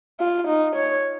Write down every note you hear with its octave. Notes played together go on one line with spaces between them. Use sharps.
F4
D#4
C#5